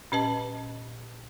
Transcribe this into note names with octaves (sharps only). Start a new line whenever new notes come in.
A#2 C#4 B4 D#5 A5